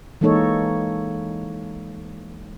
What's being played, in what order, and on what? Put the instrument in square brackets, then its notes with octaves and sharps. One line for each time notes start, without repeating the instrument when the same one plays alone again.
[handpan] E3 G#3 A#3 D#4 A4 C#5